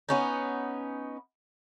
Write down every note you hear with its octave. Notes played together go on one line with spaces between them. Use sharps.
B3 C#4 D#4